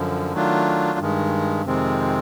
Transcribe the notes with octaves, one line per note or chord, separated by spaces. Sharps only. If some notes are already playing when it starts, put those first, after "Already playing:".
Already playing: F#2 D3 F3
D#3 F#3 A3 D4 F4
G2 D#3 G#3
F2 C3 D#3 G#3 C4